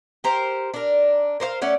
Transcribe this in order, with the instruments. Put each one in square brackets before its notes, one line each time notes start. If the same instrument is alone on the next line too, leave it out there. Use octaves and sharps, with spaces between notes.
[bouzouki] G4 A#4 C5
D4 A#4
A#4 C5 C#5 F5
A3 C#4 D5 F#5